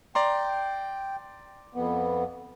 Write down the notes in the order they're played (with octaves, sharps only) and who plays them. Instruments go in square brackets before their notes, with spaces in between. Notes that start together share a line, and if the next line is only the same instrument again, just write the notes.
[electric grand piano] D5 A#5 C6 [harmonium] G5
[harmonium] F2 B3